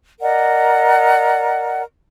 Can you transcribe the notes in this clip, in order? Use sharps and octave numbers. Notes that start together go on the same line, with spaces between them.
A#4 D5 D#5 F#5